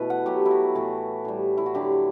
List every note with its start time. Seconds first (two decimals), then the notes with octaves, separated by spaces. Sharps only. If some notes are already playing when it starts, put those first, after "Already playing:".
Already playing: B2 E3 A3 B4
0.10 F#5
0.26 B2 F#3 A3 G4
0.46 E4
0.51 F#4
0.75 A2 E3 A3
1.25 A2 G3
1.58 E4
1.66 F#4
1.74 D3 F#3 A3 G4